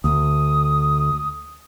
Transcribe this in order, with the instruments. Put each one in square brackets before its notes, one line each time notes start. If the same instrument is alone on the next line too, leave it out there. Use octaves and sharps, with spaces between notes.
[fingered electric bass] D2 [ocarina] D#6